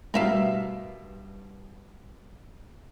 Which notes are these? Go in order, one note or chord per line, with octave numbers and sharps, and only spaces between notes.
G2 B2 G3 A#4 E5 F5